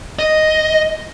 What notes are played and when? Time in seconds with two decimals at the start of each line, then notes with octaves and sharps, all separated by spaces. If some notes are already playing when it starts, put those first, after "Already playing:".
0.19 D#5